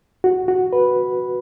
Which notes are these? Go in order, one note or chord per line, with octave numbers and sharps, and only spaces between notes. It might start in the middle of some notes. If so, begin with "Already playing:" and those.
F#4
F#4
B4